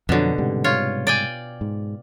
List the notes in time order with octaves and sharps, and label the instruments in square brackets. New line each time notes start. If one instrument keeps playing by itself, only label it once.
[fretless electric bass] F2 F3 F#3 [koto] B2 D3
[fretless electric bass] G#2 C3 G3
[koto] F4 C#5
D5 G5 G#5
[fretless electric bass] G#2